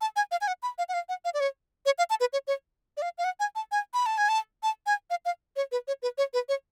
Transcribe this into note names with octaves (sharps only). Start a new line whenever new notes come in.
A5
G#5
F5
G#5
F#5
B5
F5
F#5
F5
F#5
F5
D5
C#5
C#5
F5
A5
B4
C#5
C#5
D5
F5
F5
F#5
G#5
A5
G#5
B5
A5
G#5
A5
A5
G#5
F5
F5
C#5
B4
C#5
B4
C#5
B4
C#5